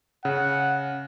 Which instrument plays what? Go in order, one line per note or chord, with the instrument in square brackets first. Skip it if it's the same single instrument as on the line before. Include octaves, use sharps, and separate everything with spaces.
[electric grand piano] C#3 [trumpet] F#5